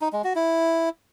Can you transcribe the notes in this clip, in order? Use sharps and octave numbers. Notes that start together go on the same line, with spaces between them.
D#4
G#3
F#4
E4